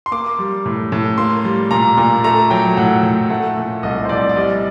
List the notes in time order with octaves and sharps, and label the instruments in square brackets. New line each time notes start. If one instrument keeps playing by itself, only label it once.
[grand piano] C6
A#3 D6
G3
A2
A2
A#3 C6
G3
A#2 A#5
A#2
A3 A#5
F#3 G5
A2 F#5
A2
A3 F#5
A#2
C2 D#5
C5
C2 D5
D5
G3 D#5